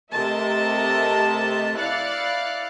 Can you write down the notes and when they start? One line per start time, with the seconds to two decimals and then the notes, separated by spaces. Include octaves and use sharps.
0.13 C3 A3 A#4 D#5 E5 A5
1.77 E4 D5 F5 F#6 A6 C#7